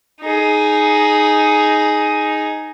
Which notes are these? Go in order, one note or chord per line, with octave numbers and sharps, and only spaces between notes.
D#4 G#4